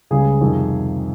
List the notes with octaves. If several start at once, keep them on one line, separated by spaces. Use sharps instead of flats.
C#2 C#3 G3 G#4
F2 C3 D#3 G3